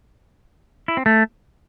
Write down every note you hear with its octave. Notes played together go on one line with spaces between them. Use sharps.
E4
C4
A3